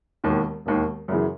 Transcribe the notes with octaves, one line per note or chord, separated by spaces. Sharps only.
E1 D#2 D#3
E1 D#2 D#3
F#2 C#3 E3